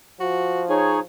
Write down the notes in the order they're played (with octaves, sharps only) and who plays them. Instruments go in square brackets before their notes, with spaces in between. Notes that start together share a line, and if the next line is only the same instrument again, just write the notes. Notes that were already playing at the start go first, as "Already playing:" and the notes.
[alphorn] F3 [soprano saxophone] F#4
[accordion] D#4 C#5 [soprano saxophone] G#4